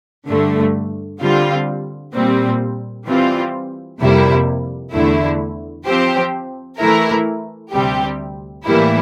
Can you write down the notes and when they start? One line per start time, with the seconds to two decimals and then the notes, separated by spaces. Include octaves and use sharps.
0.28 G2 D3 A3
1.20 D3 G3 C4 F4
2.14 A#2 G3 C4
3.07 E3 G3 C4 F4
4.00 F2 C3 G3 A#3 E4
4.93 E2 D3 A3 E4
5.86 F3 C4 G4 C5
6.78 E3 A3 E4 A#4
7.72 D2 C3 G3 C4 G4
8.65 A2 E3 G3 A#3 E4